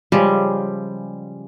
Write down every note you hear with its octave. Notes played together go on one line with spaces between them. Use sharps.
C#3 F3 G3 G#3